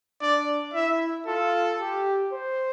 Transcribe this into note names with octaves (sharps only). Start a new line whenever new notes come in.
D4 D5
E4 E5
F4 A4
G4
C5